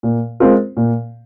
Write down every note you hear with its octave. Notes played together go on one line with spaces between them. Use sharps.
A#2
G#3 C4 F4 A#4
A#2